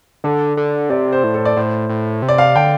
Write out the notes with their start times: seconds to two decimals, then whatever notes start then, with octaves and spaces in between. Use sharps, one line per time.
0.24 D3 A4
0.57 D3
0.90 C3 D5
1.12 C5
1.24 A2
1.34 A4
1.45 D5
1.57 A2 C5
1.89 A2
2.22 C3
2.29 D5
2.38 F5
2.56 D3 G5